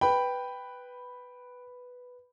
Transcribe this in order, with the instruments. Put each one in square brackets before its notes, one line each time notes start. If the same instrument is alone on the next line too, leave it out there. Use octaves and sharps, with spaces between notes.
[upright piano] B4 B5 [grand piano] G5